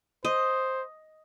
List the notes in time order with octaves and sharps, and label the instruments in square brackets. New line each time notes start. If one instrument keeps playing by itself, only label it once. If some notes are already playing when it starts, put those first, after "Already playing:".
[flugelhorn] C5 [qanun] D#5